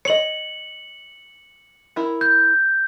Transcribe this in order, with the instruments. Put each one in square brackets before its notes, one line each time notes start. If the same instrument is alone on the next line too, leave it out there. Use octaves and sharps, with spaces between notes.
[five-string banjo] C#5 D#5 [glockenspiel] C#7 F#7
[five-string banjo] E4 A#4
[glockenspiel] G6